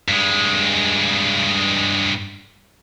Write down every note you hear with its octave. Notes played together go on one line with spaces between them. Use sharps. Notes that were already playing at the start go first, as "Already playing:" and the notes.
G2 G#3